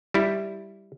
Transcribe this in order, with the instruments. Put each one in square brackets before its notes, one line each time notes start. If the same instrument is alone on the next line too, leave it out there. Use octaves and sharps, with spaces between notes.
[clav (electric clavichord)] G3 E4